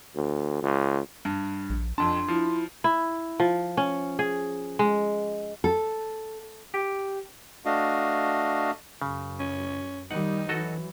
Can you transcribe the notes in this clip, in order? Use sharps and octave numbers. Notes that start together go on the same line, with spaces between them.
D2
C#2
G2
A#1
F1 F2 D4 A5 C6
F3 E4
E4
F3
C#4
G#4
G#3
A4
G4
A3 D4 F#4 D#5 F5
F#2 C#3
C#4
D#3 G3 D#4 F#5
E3 F#3 F#4 A4 D#5